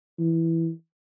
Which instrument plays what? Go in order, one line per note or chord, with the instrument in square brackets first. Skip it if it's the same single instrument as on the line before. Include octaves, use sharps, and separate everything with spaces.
[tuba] E3